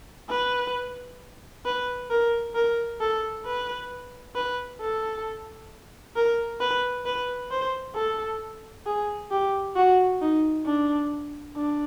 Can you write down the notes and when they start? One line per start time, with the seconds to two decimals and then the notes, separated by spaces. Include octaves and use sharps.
0.30 B4
1.65 B4
2.10 A#4
2.55 A#4
3.01 A4
3.45 B4
4.35 B4
4.81 A4
6.16 A#4
6.61 B4
7.06 B4
7.51 C5
7.96 A4
8.86 G#4
9.31 G4
9.76 F#4
10.21 D#4
10.66 D4
11.56 D4